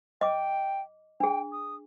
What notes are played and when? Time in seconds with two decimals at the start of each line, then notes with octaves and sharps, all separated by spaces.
0.21 D#5 G5 D6
1.20 D4 G#4 G5
1.52 D#6